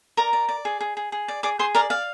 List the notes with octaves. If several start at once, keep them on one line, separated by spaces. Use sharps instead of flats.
A#4 D5 A#5
D5
D5
G#4
G#4
G#4
G#4
D5
G#4 D5 D6
G#4 C5 C6
A#4 D5 A#5
D5 F5